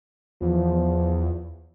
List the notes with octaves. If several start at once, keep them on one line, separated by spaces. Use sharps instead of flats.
E2 F3